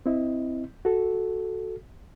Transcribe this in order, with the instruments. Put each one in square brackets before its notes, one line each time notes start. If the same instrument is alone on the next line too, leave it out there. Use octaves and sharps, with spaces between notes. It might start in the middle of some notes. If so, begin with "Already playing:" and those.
[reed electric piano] C4 E4 D#5
F#4 A4